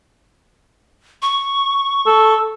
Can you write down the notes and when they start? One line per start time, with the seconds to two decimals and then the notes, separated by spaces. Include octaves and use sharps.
1.22 C#6
2.06 A4